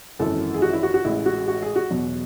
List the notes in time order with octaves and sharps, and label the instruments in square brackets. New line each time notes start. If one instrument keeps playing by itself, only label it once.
[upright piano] G#1 F#2 E3 A4
G#4
F#4
E4
F#4
F#4
A1 A2 G#3 E4
F#4
F#4
G#4
F#4
E2 B2 F#3